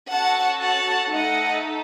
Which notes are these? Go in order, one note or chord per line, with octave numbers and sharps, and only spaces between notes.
C#4 F#4 A4 F#5 A5
F#5 A5
A3 D#4 A4 D#5 F#5